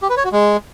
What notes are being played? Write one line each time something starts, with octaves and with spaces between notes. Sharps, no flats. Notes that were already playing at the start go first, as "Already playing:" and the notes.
G4
B4
C#5
F#4
G#3